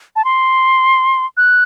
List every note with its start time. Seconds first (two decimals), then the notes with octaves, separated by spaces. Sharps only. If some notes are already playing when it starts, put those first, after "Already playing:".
0.16 A5
0.25 C6
1.37 F#6